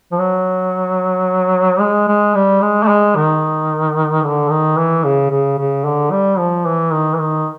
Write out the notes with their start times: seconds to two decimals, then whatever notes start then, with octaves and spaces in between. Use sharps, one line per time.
0.12 F3
0.19 F#3
1.80 G#3
2.08 G#3
2.35 G3
2.61 G#3
2.83 A3
2.88 G#3
3.16 D#3
4.23 D3
4.50 D#3
4.78 E3
5.04 C#3
5.30 C#3
5.58 C#3
5.85 D3
6.11 G3
6.38 F3
6.66 E3
6.93 D#3
7.14 E3
7.20 D#3